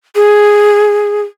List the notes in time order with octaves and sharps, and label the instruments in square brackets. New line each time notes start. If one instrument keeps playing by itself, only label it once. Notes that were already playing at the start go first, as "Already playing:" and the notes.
[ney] G#4